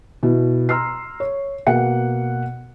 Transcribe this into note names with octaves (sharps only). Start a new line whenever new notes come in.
B2 E4
A#5 C6 E6 F6 C7
C#5
B2 A#3 F#5 C#7